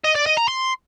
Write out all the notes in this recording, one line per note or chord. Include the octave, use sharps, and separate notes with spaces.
D#5
D5
D#5
A#5
C6